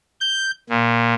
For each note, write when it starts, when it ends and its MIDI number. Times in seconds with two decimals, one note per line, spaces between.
0.21 0.51 91
0.70 1.14 46